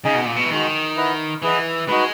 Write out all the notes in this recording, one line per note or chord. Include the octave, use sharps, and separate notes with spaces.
C#3 D#4 G#4 D#5 G#5
B2
A#2
B2
E3
D#3 G#3 D#4 F#4
E4 B4 D#5 F#5
E3 E4 G#4 B4 D#5 F#5
G#3 D#4 F#4 B4